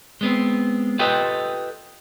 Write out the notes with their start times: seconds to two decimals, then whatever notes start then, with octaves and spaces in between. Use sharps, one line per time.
0.21 G#3 B3 C4
0.99 F4 G4 A4 B4 D#5 G5